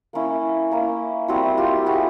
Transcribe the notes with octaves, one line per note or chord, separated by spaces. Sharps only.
A#3 C#4 E4
A#3 C#4 E4
G3 C4 E4 F#4
F4 G4
G3 C4 E4 F#4 G#4